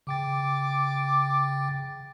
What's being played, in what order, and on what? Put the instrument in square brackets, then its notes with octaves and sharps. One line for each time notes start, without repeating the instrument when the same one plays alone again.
[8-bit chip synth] C#3 G5 A6 [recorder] D6